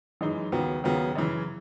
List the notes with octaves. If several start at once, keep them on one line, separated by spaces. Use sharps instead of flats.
F#2 E3 G#3 D#4 G#4
D#2 C#3 F#3 B3
D#2 C#3 F#3 B3
F#2 C#3 E3